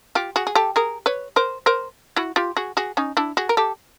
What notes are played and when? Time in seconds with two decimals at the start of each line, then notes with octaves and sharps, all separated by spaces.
0.15 F4 G4
0.36 F#4 G#4
0.47 G#4
0.55 G4 A4
0.76 G#4 A#4
1.06 B4 C#5
1.36 A#4 C5
1.66 A#4 C5
2.16 E4 F#4
2.36 F4 G4
2.57 F#4 G#4
2.77 F#4 G#4
2.97 C#4 D#4
3.17 D4 E4
3.37 F#4 G#4
3.49 A#4
3.57 G4 A4